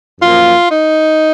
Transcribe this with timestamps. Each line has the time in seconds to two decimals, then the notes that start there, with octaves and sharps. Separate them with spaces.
0.20 F#2 F3 A#3 F4
0.69 D#4